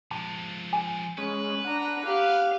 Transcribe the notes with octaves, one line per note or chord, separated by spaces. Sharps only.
F3 G#3 A5
G#5
G#3 C#4 B4
D4 F#5 A#5
G4 F5